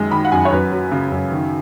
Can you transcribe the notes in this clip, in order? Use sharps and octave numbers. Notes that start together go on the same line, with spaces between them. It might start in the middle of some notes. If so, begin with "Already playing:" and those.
Already playing: F#2 D#3 G#3
D#3 B5
F#5
F#2 G#5
C#5
F#2 B4
F#3
C#3
F#2
D#3